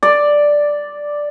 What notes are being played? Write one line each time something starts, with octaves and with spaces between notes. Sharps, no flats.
D5